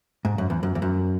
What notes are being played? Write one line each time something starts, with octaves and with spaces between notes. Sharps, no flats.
G#2
F#2
E2
F#2
E2
F#2